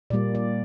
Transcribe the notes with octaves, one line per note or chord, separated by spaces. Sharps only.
A#2 G3 A#3 D5
D5